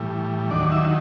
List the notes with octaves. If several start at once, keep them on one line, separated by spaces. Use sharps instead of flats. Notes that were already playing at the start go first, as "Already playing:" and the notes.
Already playing: A2 E3 G3
D#2 D#3 F#3 D4 D5
E4 E5